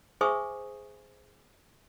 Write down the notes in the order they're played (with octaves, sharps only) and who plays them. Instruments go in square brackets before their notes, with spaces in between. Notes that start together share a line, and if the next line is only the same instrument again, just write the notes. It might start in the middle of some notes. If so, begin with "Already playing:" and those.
[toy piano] G#4 C5 E5 G#5 C#6 D#6